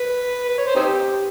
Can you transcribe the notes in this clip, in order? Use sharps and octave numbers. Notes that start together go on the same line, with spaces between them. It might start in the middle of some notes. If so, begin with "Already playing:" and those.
Already playing: B4
B4
C#5
C5
C4 D#4 G4